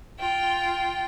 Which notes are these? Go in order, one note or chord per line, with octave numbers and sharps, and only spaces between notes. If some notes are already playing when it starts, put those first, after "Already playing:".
F4 G5